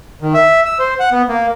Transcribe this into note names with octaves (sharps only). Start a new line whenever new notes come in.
D#3
E5
E6
C5
F#5
B3
A#3